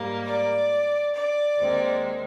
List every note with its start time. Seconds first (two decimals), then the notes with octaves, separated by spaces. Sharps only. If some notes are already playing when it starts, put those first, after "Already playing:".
Already playing: G#2 G3 A#3
0.25 D5
1.14 D5
1.58 D#2 D#3 G#3 C4